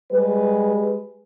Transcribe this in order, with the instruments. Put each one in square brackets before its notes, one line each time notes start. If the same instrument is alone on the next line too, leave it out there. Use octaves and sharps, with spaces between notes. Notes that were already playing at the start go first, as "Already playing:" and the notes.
[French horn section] G3 G#3 G#4 B4